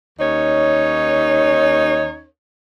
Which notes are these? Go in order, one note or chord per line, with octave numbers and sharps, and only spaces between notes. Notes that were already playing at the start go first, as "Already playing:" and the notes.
D#2 C#4 D#4 C#5